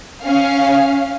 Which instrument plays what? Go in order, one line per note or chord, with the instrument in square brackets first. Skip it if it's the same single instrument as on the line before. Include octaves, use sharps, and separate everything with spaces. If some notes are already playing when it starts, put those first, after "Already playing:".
[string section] C#4 F5